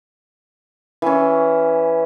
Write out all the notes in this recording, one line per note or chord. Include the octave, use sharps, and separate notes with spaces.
E3 C#4